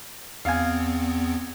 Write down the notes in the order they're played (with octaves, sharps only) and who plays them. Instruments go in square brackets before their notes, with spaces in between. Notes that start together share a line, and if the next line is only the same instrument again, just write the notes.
[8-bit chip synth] E2 B3 C4 [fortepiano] F5 G#5